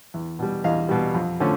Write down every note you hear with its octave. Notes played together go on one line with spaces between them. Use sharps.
E2
B2 G3
E2 D#5 F5
B2 G3
F2
D3 F3 A3 C#4